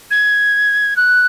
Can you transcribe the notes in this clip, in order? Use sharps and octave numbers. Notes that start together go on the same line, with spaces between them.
G#6
F#6